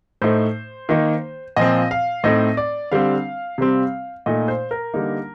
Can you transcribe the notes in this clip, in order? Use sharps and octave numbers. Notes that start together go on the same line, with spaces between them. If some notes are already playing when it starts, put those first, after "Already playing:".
A2 A3 D#4 C5
D#3 A#3 D#4
A#2 F3 C4 D#5
F5
A2 A3 C4 D#4 D#5
D5
D3 G3 C4 F5
C3 G3 C4
A#2 A3 D#4 D#5
C5
A#4
D3 G3 A#3 D#4